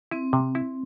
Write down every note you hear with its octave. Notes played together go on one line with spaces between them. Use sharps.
C4 E4
C3
E4